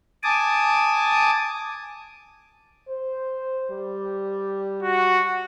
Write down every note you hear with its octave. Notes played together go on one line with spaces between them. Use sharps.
G#5 A5 D6 D#6
C5
G3
F#4